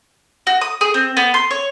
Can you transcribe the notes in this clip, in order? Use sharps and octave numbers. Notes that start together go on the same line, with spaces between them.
F#4
D#6
G#4
C4
B3
C6
C#5